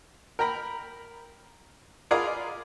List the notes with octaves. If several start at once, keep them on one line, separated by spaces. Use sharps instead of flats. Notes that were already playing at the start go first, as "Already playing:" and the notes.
A#4 G5 A#5 B5
F4 G#4 A#4 D5 F5 B5